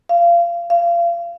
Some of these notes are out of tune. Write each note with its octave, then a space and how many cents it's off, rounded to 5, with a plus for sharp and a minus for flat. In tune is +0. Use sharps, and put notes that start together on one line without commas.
F5 -25
F5 -30